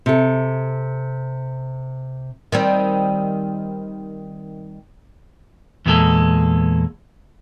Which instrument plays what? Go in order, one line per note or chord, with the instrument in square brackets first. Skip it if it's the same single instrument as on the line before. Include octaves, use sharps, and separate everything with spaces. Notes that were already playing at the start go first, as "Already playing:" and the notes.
[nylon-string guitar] C3 A4
[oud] D#3 G3 C4
[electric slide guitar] E2 A#2 G#3 A4